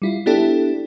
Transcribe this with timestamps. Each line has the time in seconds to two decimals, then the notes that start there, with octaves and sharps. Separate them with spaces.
0.02 G3 E4 F4
0.26 B3 D4 E4 G4 A4